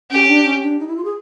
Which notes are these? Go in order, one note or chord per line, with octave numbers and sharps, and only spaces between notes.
C#4 G4
D4
C#4
D4
D#4
E4
F4
G#4